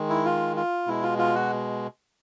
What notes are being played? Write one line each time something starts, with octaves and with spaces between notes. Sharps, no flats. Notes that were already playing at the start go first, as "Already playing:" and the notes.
Already playing: D#3 G#3
E4
F4
F4
B2 G#3 E4
F4
F4
F#4